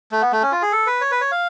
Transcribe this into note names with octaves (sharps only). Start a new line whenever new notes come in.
A3
B3
A3
C#4
F4
G#4
A4
B4
C#5
B4
C#5
F5